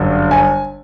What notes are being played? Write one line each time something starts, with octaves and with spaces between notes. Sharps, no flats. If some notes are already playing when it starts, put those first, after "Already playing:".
Already playing: G1 F#2 D3
G#5